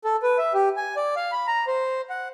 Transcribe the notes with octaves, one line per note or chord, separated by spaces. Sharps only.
A4
B4
E5
G4
G#5
D5
F5
B5
A#5
C5
F#5